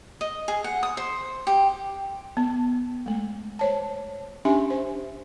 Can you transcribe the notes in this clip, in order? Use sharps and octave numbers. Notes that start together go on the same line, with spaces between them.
D#5
G#4
F#5
D#6
C5
G4
B3
G#3 A3
C5 C#5 A5
C#4 D4 G4 E5 G#5
C5